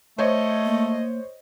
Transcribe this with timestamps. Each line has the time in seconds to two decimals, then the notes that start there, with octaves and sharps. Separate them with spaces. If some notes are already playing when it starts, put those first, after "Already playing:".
0.18 A3 C5 C#5 D#5
0.65 A#3